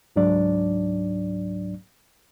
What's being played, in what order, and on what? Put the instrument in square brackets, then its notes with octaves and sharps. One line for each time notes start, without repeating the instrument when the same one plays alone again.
[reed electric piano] C#2 G#2 F#3 D4 D5